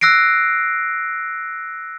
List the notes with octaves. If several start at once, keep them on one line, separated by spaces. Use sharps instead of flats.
E6 F#6 A#6 C7 D7